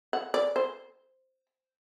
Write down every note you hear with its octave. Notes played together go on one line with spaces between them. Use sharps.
F#5
D5
C5